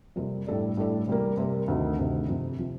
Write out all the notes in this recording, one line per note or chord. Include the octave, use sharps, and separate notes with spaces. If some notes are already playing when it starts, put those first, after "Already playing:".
F2 C3 G3 A#3
A2 G3 D4 A4 D5
A2 G3 D4 A4 D5
C3 G3 A#3
C3 G3 A#3
D2 C3 D#3
D2 C3 D#3
F2 C3 F3
C3 F3